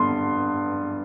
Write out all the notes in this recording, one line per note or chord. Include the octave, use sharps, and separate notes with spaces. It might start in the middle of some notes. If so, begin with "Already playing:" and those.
Already playing: G2 D3 B3 C6